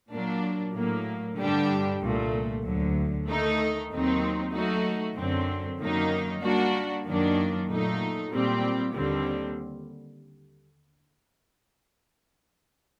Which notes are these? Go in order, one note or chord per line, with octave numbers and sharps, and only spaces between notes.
A#2 F#3 A#3 D4
A2 F#3 A#3
G2 D3 G3 D4 G4
C2 A#2 A3
D2 D3 F#3
D#3 A3 D#4
D#2 D#3 F#3 C4 D#4
F#3 A3 D#4 F#4
F#2 D3 F#3 C4
F#2 D#3 F#3 A#3 D#4
G3 A#3 D4 F#4
F#2 D#3 F#3 A#3 D4
A#2 F#3 A3 D#4
A#2 G3 C4 G4
D#2 D3 G3 C4